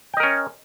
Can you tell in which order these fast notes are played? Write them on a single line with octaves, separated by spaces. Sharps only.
G5 D#5 A#4 C#4